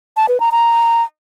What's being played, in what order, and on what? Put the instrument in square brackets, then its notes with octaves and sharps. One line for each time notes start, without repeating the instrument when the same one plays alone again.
[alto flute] A5
B4
A#5
A#5